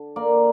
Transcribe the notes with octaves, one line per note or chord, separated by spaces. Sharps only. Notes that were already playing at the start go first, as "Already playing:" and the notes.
Already playing: D3
A#3 D5